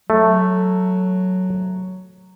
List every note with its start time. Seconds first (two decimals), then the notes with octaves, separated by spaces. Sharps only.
0.10 F#3 A3